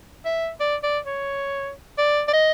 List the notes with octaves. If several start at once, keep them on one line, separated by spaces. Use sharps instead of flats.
E5
D5
D5
C#5
D5
D5
D#5